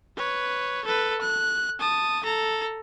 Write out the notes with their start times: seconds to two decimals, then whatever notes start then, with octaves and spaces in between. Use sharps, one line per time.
0.17 B4 C#5
0.85 A4 B4
1.22 F#6
1.79 A5 D#6
2.24 A4 A#5